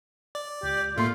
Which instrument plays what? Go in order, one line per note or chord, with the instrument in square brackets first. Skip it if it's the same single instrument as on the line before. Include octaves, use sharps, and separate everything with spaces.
[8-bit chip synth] D5
[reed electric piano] C#2 [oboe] G4
[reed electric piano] A2 A#3 C6 [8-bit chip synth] A3 [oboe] F4